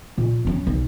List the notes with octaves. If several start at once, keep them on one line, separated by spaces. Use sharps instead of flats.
A#2
F#3 C#4
B1